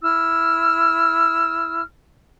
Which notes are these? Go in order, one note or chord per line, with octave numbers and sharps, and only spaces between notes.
E4 E6 F6